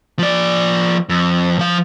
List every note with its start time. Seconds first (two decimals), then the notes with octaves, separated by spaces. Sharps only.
0.19 F3 D5
1.09 F2
1.59 F3 F5